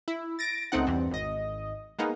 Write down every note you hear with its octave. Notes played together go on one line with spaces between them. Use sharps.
E4
A6 A#6 D7
C#2 A3 C4 D#4 F#5
E2 G2 C4
G#1 D#5
G#3 A#3 B3 D#4